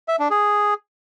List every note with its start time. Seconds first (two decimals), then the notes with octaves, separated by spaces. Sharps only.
0.08 E5
0.19 D4
0.31 G#4